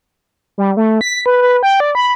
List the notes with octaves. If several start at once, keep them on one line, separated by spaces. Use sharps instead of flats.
G3
A3
B6
B4
B4
G5
D5
B5